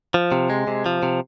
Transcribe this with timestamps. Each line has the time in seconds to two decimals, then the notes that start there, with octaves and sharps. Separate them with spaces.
0.14 F3
0.32 C3
0.50 G#3
0.67 C3
0.86 F3
1.03 C3